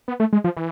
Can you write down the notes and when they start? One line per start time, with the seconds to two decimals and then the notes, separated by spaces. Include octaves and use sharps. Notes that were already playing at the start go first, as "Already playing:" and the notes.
0.08 B3
0.20 A3
0.33 G#3
0.44 F3
0.57 E3